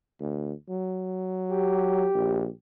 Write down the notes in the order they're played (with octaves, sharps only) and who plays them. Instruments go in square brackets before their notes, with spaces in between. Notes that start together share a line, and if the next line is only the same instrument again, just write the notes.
[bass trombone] D2
F#3
[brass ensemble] G4
[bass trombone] A#1